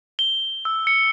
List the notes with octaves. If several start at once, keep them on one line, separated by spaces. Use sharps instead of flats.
G7
E6
C#7